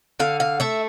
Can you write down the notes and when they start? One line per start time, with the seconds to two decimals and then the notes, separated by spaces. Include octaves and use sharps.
0.19 D3 F5
0.40 F5
0.60 A3 E5